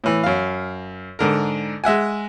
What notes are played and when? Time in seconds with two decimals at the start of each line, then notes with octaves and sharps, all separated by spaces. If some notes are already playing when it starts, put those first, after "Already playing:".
0.04 A2 E3
0.24 F#2 F5
1.19 G#2 D3 A#4
1.84 G#3 E5 F#5 G#5